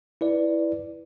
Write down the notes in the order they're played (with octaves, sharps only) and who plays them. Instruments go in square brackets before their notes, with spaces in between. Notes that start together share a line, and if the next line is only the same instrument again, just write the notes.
[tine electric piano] E4 B4 D5